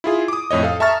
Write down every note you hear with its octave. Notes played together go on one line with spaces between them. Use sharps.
E4 F4 G#4
D6 D#6
F2 A2 C#5 D#5
A4 F5
E5 A5 A#5 C#6 F6 A6